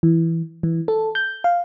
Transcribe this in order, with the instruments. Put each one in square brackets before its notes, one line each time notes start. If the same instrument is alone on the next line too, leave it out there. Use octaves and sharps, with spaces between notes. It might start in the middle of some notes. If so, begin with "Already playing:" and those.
[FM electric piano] E3
E3
A4
G6
F5